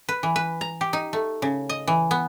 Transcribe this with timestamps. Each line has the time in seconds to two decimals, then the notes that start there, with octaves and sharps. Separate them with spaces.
0.09 B4
0.23 E3
0.36 B4
0.61 A#5
0.81 G4
0.93 D#4
1.13 A3
1.42 C#3
1.69 D#5
1.87 E3
2.11 B3